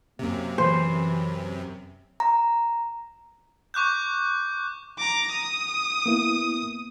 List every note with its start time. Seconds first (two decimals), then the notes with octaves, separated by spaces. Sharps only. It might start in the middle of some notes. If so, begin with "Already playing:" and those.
0.19 F#2 C3 A#3
0.58 E3 C5
2.20 A#5
3.74 C#6 D6 F#6 G6
4.99 A#5 D6
5.32 D#6
6.06 A#3 B3 E4